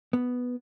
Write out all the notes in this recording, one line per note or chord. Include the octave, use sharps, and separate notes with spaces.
B3